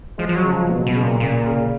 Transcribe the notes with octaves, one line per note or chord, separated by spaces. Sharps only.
F3 G#3
F3
F#3
C#3
F3
B2 F#3
B2
C#3
A#2
A#2 C#3
C#3